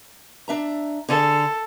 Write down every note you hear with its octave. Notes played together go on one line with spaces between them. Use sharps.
D4 E5 A#5
D3 G#4 A4 F5